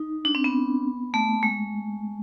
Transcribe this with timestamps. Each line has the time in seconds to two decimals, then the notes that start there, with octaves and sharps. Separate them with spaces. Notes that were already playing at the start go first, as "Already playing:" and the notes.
Already playing: D#4
0.25 D4
0.35 C4
0.44 B3
1.14 A3
1.43 G#3